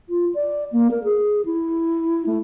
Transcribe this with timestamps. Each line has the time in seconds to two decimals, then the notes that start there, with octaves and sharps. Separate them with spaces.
0.09 F4
0.35 D5
0.72 A#3
0.91 A#4
1.04 G#4
1.45 E4
2.26 A3